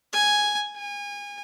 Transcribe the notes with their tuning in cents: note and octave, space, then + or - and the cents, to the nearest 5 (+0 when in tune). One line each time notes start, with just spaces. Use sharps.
G#5 +0
G#5 -30